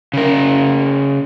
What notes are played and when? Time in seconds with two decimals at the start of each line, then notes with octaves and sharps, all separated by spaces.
0.14 C#3 A#4